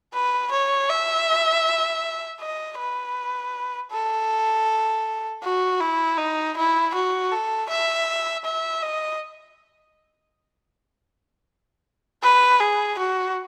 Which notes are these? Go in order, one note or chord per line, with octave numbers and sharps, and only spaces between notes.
B4
C#5
E5
D#5
B4
A4
F#4
E4
D#4
E4
F#4
A4
E5
E5
D#5
B4
G#4
F#4